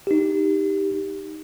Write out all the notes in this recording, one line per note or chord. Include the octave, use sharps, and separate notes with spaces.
D#4 G4